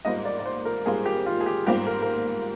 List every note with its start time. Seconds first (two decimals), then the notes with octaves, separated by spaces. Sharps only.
0.05 G#2 G3 A#3 F4 C5 D#5
0.25 D5
0.39 D5
0.46 C5
0.65 A#4
0.86 G#2 G3 A#3 F4 G#4 C5
1.06 G4
1.26 F4
1.41 G#4
1.46 G4
1.66 G#2 G3 A#3 F4 G4 C5
1.87 A#4
2.02 A#4